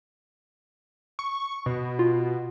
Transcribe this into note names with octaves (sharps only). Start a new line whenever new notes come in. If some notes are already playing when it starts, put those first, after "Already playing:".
C#6
B2
F4